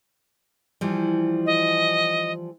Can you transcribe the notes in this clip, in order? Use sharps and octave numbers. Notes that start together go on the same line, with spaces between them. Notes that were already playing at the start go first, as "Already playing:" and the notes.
E3 F3 G3
D#5